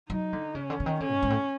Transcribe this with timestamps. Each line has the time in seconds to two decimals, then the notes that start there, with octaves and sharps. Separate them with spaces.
0.10 F#3 D#4
0.33 D3
0.55 C#3 C#4
0.70 D3
0.80 D3
0.86 D#3
1.00 D3 C#4
1.11 G#2
1.22 G#2
1.30 A2